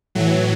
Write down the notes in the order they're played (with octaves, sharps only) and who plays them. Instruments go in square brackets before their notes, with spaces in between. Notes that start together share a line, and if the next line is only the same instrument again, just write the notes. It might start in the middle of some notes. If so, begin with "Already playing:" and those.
[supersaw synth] A2 E3 F#3